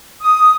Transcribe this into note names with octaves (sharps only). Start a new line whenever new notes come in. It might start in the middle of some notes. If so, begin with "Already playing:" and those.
D#6